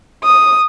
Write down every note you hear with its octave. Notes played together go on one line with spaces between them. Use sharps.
D#6